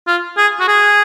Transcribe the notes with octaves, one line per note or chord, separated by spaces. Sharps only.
F4
G#4
F#4
G#4